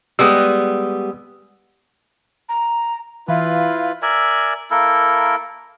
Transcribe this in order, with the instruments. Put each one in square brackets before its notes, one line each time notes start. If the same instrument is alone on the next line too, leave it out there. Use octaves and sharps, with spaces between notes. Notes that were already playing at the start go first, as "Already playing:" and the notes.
[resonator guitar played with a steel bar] G3 G#3 B3 [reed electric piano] D#6 E6
[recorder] A#5
[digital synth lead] E3 [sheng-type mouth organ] E4 F4 B4 [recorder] F5
[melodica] A#4 D5 E5 G#5
A#3 E4 A4 A#4